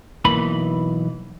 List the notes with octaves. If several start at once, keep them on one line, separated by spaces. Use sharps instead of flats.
B1 E3 A#3 B5